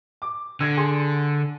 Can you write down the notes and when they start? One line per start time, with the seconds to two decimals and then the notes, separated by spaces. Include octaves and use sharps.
0.22 D6
0.61 D3 E6 G#6 A#6
0.77 G#4 C6